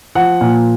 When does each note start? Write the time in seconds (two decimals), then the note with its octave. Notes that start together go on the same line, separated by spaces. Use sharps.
0.15 F3 F#5
0.41 A#2